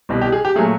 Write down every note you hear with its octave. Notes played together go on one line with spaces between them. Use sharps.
C2 B2 G3
G4
G#4
G4
A#2 F#3 A3 G#4